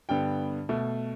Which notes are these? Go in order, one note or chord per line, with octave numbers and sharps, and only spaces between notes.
G2 D3 B3 G5
B2 A3